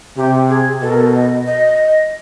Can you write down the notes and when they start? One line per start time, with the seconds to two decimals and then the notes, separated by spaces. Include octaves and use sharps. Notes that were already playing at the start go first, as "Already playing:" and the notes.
0.17 C3 G4
0.49 G#4
0.82 B2 A4
0.91 A#4
1.00 A4
1.15 D#5
1.47 D#5